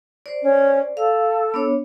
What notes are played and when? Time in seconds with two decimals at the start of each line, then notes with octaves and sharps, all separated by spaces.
0.26 C5 D5
0.43 C#4
0.97 A4 F5
1.54 B3 D4 C#5